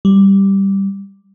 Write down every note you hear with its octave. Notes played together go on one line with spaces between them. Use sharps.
G3